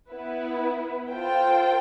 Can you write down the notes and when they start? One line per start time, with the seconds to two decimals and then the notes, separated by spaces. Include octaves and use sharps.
0.11 B3 E4 B4
1.13 F4 A4 C5 G5